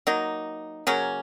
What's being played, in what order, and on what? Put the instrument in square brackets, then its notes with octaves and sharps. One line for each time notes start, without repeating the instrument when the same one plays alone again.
[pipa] F#3 A#3 D#4
C#3 F#3 A#3 C#4